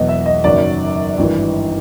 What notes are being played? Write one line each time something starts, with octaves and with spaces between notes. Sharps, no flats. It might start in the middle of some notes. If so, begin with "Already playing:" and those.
Already playing: E1 E2 B2 F#3 D#5
E5
D#5
F#1 F#2 D#3 F#3 D5
G#1 G2 E3